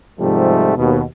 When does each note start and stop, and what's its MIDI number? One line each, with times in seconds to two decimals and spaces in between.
0.19 0.73 44
0.19 0.73 48
0.19 0.73 53
0.19 0.73 55
0.19 0.73 57
0.76 1.02 39
0.76 1.02 47